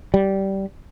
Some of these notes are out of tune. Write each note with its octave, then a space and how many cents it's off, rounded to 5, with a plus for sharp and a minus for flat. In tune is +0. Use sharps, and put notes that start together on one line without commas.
G3 -15